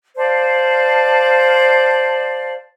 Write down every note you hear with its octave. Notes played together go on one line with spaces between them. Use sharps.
C5 D5 F5 A5